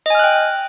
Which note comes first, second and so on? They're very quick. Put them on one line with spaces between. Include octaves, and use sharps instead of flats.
D#5 G#5 F6 F#6 G5